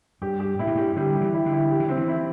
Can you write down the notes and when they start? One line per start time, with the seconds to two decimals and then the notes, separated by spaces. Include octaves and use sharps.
0.22 G2 G4
0.40 G4
0.59 G2 E4
0.67 A2
0.75 G2 G4
0.96 D3 G3
1.15 G4
1.21 E3
1.34 E4
1.46 D3
1.52 E4
1.71 G4
1.80 E3
1.88 D3 C4
1.97 E3
2.08 E4